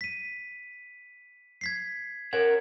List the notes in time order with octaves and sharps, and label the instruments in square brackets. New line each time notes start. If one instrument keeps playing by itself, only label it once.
[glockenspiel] B6 D#7
G#6 B6 C7
[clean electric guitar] A#4 C#5 F#5 [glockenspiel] G#6